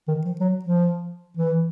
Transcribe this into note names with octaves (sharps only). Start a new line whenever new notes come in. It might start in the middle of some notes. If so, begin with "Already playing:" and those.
D#3
F3
F#3
F3
E3